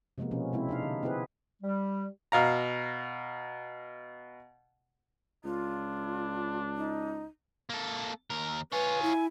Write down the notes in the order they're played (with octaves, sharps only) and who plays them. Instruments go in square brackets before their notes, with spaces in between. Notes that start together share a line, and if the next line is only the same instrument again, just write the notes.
[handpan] C3 F3 G#3 A#3 B3
B2 F3 C#4
C3 G#3 C4 E4
C3 D4 D#4 F5
D3
B3 C4 E4 G#4 B4
[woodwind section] G3
[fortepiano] B2 F5 A#5
[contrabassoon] C#2 [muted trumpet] D4 [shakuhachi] F4
[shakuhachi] D#4
[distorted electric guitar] A#3 A4
D#2 A#4
[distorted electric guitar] F4 C#5 [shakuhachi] B4 [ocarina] G#5
[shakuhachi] E4